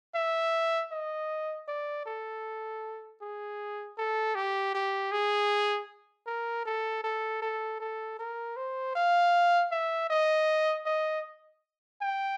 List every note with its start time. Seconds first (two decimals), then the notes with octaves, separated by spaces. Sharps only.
0.15 E5
0.92 D#5
1.68 D5
2.06 A4
3.22 G#4
3.98 A4
4.35 G4
4.75 G4
5.12 G#4
6.27 A#4
6.66 A4
7.04 A4
7.42 A4
7.80 A4
8.19 A#4
8.57 C5
8.95 F5
9.72 E5
10.10 D#5
10.86 D#5
12.02 G5